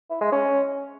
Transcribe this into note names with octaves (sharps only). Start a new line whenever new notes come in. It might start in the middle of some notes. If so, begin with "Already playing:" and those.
E4
G#3
C#4